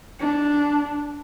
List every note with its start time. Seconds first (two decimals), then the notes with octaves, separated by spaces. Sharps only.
0.20 D4